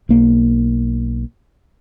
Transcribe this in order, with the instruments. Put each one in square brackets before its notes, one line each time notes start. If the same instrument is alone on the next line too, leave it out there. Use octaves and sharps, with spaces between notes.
[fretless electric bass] B1 A#3